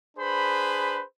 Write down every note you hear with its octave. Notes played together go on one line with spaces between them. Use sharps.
D4 G#4 B4 C5 B5